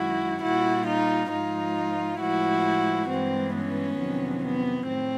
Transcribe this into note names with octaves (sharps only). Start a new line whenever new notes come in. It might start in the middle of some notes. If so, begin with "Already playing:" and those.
Already playing: F#2 D#3 G#3 E4 F#4
A#2 G3 E4 F#4
D#4 F4
G#2 F3 G#3 D#4 F4
A2 F3 G#3 E4 F#4
G2 E3 G#3 C4
B3 C#4
F2 C3 D#3 F#3
B3
A2 C4